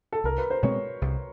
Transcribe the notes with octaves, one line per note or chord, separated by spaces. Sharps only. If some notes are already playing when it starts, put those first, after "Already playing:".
A4
C2 A#4
B4
C5
B2 G#3 C4 C#5
C2